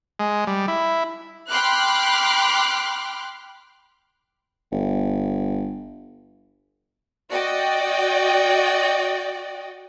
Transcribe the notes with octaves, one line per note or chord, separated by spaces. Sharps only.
G#3
G3
E4
G5 B5 C6 D6 F6 F#6
G1
F#4 D5 D#5 G5